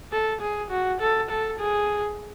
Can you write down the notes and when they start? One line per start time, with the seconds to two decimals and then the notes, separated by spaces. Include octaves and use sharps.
0.12 A4
0.41 G#4
0.70 F#4
1.00 A4
1.30 A4
1.59 G#4